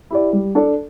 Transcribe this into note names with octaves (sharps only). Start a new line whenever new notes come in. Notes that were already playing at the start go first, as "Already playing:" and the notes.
E4 G4 D5
G3
D4 A4 D5